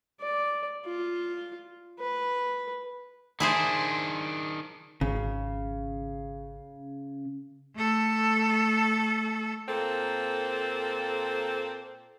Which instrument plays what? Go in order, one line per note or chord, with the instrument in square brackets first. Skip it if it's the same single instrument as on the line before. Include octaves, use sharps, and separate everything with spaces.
[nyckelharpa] D5
F4
B4
[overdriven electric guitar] D#3 D4 [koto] E4 G#4 C5
[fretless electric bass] G#1 [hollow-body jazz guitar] C#3
[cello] A3 A4
[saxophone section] A#2 A#3 C4 A4